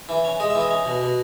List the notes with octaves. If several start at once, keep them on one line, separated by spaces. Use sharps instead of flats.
E3
C#4
G#3 D#5
E5
E3
D#5
C#4
B2
B2